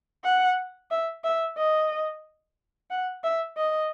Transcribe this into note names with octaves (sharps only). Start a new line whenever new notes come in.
F#5
E5
E5
D#5
F#5
E5
D#5